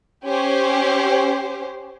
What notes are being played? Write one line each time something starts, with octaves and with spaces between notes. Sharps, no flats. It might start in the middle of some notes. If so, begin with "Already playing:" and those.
C#4 G4 C5